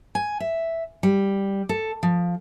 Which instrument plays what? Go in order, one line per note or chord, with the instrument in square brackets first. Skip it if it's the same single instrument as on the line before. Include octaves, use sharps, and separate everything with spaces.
[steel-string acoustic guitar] G#5
E5
G3
A4
F3